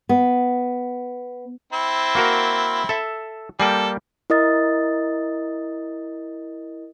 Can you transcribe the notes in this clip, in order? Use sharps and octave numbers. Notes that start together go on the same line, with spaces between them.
B3
C4 E4
A#3 F#4 A#4
A4 E5
G3 A#3 A4 G5
E4 A#4 D#5 D#6 A6